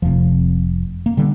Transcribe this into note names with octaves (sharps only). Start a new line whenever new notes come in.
F1 F2 C3 F3
A#3
D3 G3